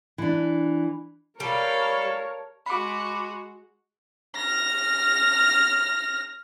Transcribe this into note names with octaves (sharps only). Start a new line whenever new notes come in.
E3 D4
G3 A4 A#4 C#5 F5
G#3 F#4 B5 D6
F6 A#6